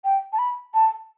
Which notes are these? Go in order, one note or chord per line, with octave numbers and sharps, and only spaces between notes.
G5
A5
B5
A5